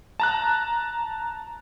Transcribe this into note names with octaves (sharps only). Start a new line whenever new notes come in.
A5 A#5 F#6